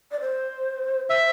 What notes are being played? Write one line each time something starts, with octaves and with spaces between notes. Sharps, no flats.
D5
C5
C5 E5